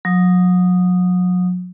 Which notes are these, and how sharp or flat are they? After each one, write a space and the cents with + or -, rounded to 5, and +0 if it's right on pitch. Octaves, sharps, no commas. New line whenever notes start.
F#3 -40 D#6 -10